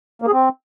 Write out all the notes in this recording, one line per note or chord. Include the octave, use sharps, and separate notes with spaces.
A#3
G#4
C4